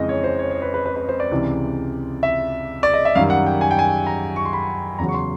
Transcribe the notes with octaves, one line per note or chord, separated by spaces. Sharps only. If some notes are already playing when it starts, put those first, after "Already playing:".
Already playing: F2 C#3 E3 G#3 D#5
C#5
C5
C#5
C#5
B4
B4
B4
B4
C5
D5
C#2 C3 E3
E5
D5
D#5
E5
F#2 D#3 G3 F5
F#5
G5
G#5
G5
G#5
A#5
C#6
C6
B5
E2 C#3 F#3 A#5
C#6
C6